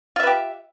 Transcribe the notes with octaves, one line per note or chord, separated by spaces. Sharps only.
F4 G4 B4 E5